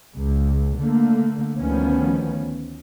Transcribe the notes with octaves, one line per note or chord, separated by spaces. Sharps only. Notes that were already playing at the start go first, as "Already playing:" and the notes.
C#2
D3 A3 A#3
D2 D#3 F3 B3 C#4